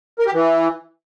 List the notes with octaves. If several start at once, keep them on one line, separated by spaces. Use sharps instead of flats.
A#4
G4
E3